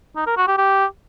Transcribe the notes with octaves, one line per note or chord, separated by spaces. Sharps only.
D#4
A#4
F#4
G4
G4